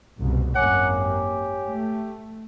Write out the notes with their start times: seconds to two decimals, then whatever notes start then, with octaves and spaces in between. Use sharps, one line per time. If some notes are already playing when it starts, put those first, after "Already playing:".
0.19 F#1 C2 B2
0.55 G#1 F#2 A#3 C#5 F#5 G#5 D6
0.99 G4
1.66 A3